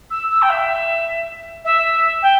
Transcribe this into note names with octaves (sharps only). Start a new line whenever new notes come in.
E6
E6
G5
E5
E5
G5